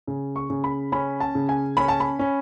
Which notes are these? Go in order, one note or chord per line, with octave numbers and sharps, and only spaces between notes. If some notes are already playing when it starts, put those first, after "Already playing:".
C#3
C#6
C#3
B5
C#4 B5
A5
C#3
G#5
C#4 B5
A5
B5
C#4